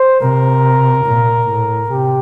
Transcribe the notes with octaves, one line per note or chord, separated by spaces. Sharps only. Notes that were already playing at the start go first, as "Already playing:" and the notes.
Already playing: C5
C3 A#4
A#2
A2
C3 G4